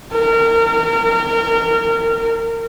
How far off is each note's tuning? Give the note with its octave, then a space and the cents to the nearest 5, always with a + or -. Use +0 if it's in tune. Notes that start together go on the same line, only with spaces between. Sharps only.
A#4 -30